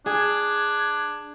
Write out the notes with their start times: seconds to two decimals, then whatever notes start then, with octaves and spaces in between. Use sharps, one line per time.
0.06 D4 G#4 G#6